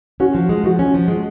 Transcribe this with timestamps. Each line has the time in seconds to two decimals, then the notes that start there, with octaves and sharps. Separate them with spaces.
0.20 C#4 F#4
0.34 F3
0.49 G#3
0.64 F3 F#4
0.79 C#4
0.94 F3
1.08 G#3